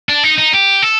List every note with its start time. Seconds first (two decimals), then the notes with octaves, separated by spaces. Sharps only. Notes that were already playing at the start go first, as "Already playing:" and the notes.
0.09 D4
0.23 D#4
0.38 D#4
0.53 G4
0.82 A4